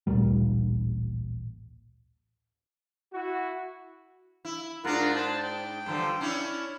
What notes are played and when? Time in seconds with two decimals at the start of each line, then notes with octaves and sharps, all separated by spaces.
0.07 A1 D2 A#2 G3
3.13 E4 F#4
4.45 E4
4.85 G#2 D4 F4 A#4 F#5
5.16 C5 A5
5.43 G5
5.86 G2 D3 F3
6.21 C#4 D4 E4